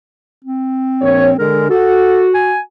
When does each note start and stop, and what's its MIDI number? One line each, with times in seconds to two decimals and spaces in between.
0.44 1.36 60
1.01 1.30 34
1.01 1.30 73
1.39 1.66 50
1.39 1.66 56
1.39 1.67 70
1.70 2.55 66
1.70 2.29 69
2.34 2.60 80